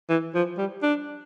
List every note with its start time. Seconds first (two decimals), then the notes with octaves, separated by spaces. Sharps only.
0.10 E3
0.35 F3
0.58 G3
0.83 D4